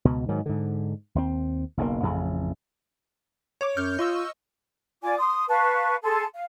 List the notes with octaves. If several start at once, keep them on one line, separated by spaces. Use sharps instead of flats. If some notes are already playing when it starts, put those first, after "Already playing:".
C#2 B2
G#2 D#3 F#3
G#2 D3
D#2 G#3 C4
F#1 B1 C#3 A#3
A1 F2 C#3
C#5 D6
F#2 F6 G6
F4 D#5 C#6 E6
F4 D5 G#5 D6
C6 D#6
B4 F5 A5 C#6
G#4 A4 A5 C6
F5